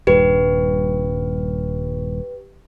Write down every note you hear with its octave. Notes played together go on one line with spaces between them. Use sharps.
D#1 G2 G4 B4